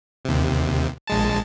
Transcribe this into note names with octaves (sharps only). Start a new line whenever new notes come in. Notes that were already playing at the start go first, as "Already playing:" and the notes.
D#2 C3
A#1 G#3 A5